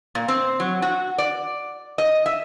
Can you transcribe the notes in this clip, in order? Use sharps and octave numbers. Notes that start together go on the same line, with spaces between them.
A#2
C4
F#3
F#4
D5
D#5
E5